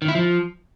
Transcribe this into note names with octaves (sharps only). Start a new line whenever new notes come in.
D#3
E4
F3